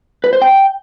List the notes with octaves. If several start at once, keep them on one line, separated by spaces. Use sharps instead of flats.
B4
C5
G5